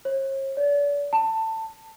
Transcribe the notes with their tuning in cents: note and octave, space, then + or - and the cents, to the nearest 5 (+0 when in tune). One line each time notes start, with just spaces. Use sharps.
C#5 -45
D5 -40
A5 +20